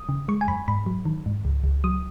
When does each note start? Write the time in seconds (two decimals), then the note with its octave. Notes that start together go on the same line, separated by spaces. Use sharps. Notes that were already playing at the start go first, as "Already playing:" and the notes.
Already playing: D#6
0.09 C#3
0.28 G#3 C#6
0.41 G#5
0.48 F#2 B5
0.68 G#2 B5
0.86 F#3
1.05 D#3
1.26 G#2
1.45 C#2
1.64 C#2
1.84 F#3 D#6